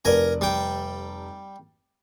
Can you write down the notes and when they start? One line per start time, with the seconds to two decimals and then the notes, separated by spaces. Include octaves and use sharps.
0.05 F1 A#4 D5 G#5 A#5
0.41 G3 G5